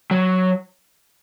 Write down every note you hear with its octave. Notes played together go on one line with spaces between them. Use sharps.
F#3